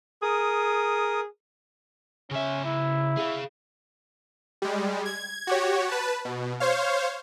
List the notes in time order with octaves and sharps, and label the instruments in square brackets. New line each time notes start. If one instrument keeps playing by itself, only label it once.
[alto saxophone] G#4 [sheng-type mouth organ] A#4 D#6
[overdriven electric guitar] C#3 E5 [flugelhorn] C#4
[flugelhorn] E4
[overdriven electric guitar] G#4 F5
[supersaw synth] G3 G#3
G#6
F#4 G4 C#5
B4 A5
B2
C5 C#5 F5